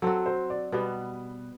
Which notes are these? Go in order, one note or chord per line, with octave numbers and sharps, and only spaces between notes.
F#3 C4 F#4 A4
C5
D5
B2 G3 B3 B4